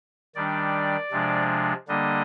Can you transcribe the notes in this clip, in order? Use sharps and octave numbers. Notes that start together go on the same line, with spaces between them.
D#3 G3 D4 D5
C3 F3 G#3 D4
D3 G3 A#3 D4 D#5